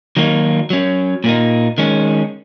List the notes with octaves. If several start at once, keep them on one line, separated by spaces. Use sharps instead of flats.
D#3 F#3 A#3 D#4
F#3 C#4
A#2 A#3 D#4
D#3 G#3 C#4